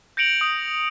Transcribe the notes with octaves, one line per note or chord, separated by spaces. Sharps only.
G6 A#6 C#7 D7 F7 F#7
D#6